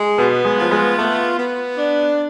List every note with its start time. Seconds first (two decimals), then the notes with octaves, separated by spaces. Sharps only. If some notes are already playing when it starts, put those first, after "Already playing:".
Already playing: G#3
0.18 B2 B3
0.45 G#3
0.57 F3 F4
0.71 G#3
0.98 A3 B3
1.38 B3
1.78 D4